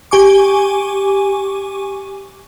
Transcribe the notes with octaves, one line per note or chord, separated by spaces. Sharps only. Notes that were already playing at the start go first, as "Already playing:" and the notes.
G4 G#5 C#6 D6